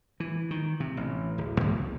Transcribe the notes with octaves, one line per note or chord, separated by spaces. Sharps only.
E3
D#3
C3
A1
D1
C2